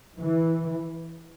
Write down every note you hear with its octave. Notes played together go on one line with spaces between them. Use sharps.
E3